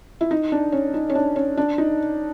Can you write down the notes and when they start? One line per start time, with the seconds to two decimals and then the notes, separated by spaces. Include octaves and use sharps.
0.21 E4
0.31 D#4
0.52 D4
0.72 C#4
0.94 D#4
1.10 C#4
1.15 D4
1.36 C#4
1.57 D4
1.78 D#4